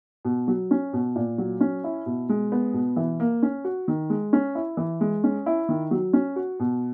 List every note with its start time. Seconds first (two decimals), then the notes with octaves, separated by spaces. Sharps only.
0.25 B2
0.48 F#3
0.71 C#4
0.93 B2
1.16 A#2
1.38 F#3
1.61 C#4
1.84 E4
2.06 B2
2.29 G#3
2.52 B3
2.73 B2
2.96 E3
3.20 A#3
3.43 C#4
3.64 F#4
3.88 D#3
4.10 G#3
4.33 C#4
4.55 E4
4.77 E3
5.01 G#3
5.24 C#4
5.46 E4
5.69 D#3
5.91 F#3
6.13 C#4
6.36 F#4
6.60 B2